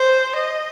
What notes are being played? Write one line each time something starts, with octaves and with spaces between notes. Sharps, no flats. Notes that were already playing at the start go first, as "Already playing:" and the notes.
Already playing: C5
D#5